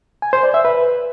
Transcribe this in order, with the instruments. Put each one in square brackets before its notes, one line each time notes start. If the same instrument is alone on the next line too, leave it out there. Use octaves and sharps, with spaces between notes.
[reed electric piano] G#5
C5
D5
E5
B4